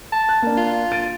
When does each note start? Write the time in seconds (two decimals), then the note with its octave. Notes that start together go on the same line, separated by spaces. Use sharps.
0.13 A5
0.29 F#6
0.42 A#3 D4
0.58 F4
0.92 A6 D7 D#7